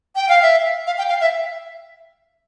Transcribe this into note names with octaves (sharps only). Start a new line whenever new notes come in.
G5
F5
E5
F5
G5
F5
E5